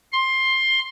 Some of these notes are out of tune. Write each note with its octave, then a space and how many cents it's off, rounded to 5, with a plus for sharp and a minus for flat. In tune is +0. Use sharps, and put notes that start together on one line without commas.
C6 +15